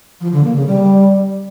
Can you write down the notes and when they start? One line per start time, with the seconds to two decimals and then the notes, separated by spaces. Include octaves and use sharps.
0.21 F3
0.32 D3
0.44 A#3
0.56 C#3
0.67 G3